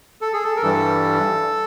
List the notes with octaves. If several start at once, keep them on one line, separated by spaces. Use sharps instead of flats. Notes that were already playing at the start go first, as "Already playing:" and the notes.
A4
G#4
A4
A#4
G2 E3 G3 A4